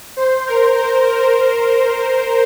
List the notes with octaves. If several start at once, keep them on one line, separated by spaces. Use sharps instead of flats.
C5
A#4
C5
A#4